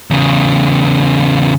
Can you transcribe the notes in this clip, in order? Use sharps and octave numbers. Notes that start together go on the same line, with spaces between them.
E2 C#3